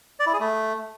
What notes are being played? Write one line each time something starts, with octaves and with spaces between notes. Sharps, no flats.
D5
E4
G#4
A3